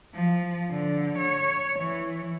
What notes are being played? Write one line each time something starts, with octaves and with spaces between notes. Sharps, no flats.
F3
D3
C#5
E3